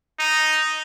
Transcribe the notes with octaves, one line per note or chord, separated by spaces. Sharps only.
D#4